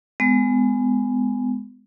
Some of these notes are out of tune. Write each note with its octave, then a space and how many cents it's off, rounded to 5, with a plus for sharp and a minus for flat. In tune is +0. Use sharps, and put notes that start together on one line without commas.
G#3 +0 B3 +30